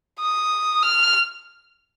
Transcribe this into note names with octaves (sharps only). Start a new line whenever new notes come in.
D#6
F6